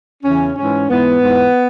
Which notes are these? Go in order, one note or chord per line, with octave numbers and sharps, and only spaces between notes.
E2 C#3 E3 C#4
G#2 E3 C#4
G#2 E3 B3
G#2 E3